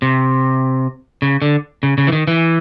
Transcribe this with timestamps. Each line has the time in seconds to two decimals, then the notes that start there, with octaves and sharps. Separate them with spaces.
0.02 C3
1.22 C#3
1.42 D3
1.83 C#3
1.98 C#3
2.07 E3
2.12 D#3
2.27 E3